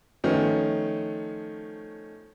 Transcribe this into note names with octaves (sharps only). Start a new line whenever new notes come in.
D#3 F3 A3 B3 C#4